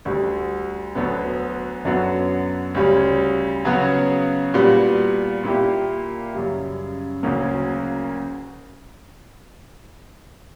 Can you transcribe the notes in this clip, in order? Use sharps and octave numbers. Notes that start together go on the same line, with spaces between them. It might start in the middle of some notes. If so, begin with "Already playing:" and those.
D2 D3 G3
D2 D3 F#3 B3
F#2 D3 F#3 B3 F#4
D2 C#3 G3 C#4
C#3 F#3 B3 F#4
A#2 G3 B3 F#4
A#2 A#3 E4 G4
F#2 C#3 G3
D2 C#3 F#3 A#3